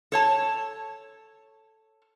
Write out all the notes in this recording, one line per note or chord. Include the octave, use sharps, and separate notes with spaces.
A4 C#5 A5